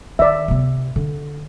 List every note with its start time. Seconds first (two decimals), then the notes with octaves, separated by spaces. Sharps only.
0.19 D#3 D5 E5
0.48 C3 B3
0.96 D3